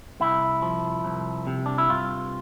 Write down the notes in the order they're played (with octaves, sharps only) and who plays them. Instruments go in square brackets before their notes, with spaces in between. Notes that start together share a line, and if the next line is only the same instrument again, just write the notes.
[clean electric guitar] C2 E4
F3
C2
C3
D4
E4
G2 F4